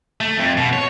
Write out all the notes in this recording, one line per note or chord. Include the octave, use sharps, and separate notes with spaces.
A3
F2
B2
C#5